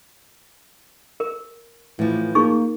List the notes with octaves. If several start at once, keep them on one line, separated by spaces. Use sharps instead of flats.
A#4
A2 E3 F3
A#3 D#4 G#4 C#6